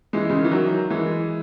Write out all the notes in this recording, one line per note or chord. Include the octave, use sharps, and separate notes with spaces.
E3 G#3
C#3
D#3
E3
D#3 F#3
E3 G#3